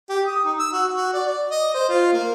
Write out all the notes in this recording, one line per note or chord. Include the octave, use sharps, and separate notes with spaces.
G4
D#6
D#4
E6
F#4
F#4
D5
D5
D#5
C5
F4
A#3